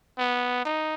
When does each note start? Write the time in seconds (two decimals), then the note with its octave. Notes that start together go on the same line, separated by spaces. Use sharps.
0.18 B3
0.65 D#4